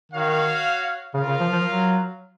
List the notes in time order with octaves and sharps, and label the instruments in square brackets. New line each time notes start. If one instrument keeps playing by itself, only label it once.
[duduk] D#3 [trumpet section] F#4 C#5 F5
[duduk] C#3 [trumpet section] F4 A#4 F5
[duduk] C#3
F3
F3
F#3